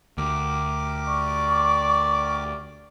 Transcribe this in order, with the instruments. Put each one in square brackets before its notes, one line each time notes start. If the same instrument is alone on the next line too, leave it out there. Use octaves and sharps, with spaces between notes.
[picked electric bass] D2 [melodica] G4 A#4 D6
[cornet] D5 [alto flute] C#6